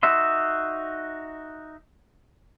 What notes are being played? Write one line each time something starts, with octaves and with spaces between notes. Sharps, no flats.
D#4 F#4 E5 C6